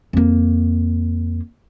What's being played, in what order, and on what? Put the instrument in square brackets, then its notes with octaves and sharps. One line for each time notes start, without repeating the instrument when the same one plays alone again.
[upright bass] F2 A#3